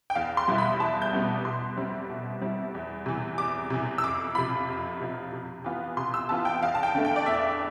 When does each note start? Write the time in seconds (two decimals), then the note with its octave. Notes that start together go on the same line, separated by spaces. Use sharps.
0.10 G5
0.15 E2 F5
0.37 C6
0.48 B2 G3 B3 E4
0.58 B5
0.80 E2 A5
1.02 G6
1.12 B2 G3 B3 E4
1.45 B2 C6
1.76 G3 C4 E4
2.10 B2
2.41 G3 C4 E4
2.74 E2
3.06 C3 E3
3.38 E2 D6
3.70 C3 E3
3.98 E6
4.03 F2 D6
4.35 C3 F3 B5
4.68 F2
5.00 C3 F3
5.33 C3
5.64 E3 B3 F4
5.97 C3 C6
6.14 E6
6.29 E3 B3 F4 A5
6.45 G5
6.62 E2 F5
6.75 A5
6.83 G5
6.95 D3 A3
7.05 G5
7.16 D5
7.26 E2 E5